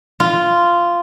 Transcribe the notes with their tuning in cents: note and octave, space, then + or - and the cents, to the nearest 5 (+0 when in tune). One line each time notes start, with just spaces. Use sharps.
F4 -10